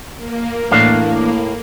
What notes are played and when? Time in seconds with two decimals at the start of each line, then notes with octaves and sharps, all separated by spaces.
0.16 A#3
0.71 A2 E3 D4 F5